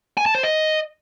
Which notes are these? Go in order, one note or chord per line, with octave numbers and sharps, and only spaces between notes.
G#5
A5
C5
D#5